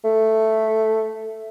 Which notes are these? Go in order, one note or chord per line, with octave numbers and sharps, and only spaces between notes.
A3